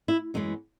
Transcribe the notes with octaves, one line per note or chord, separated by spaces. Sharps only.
E4
F#2 E3 G#3 B3 D#4